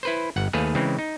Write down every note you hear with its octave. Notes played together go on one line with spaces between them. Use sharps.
E4 B4 C5
G1 F#5
D#2 A3 G#4 B4 F5
C#3 E3 G#3 C4
D#4